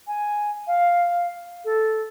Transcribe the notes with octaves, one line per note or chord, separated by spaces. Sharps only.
G#5
F5
A4